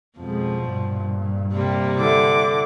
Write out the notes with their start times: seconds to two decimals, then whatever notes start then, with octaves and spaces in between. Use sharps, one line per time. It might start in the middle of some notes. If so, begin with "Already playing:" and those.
0.19 F2 B2 F3 G#3
0.64 G2 A#2
1.53 C3 G3 A#3
1.98 D3 E4 D6